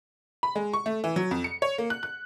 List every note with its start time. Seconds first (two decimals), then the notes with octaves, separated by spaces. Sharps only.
0.43 B5
0.56 G#3
0.73 C#6
0.86 A3
1.04 E3
1.16 F#3
1.31 F2
1.44 C#7
1.62 C#5
1.78 A#3
1.90 F#6
2.03 F#6